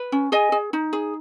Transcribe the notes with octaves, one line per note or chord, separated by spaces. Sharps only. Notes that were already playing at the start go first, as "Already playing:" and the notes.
Already playing: B4
C#4
G#4 D#5 G#5
G#4
D#4
G#4